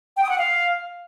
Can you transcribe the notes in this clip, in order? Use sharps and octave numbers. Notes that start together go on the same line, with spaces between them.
G5
D#6
F#5
F5